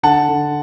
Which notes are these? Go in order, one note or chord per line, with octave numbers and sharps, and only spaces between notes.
D3 F#5 A5
D3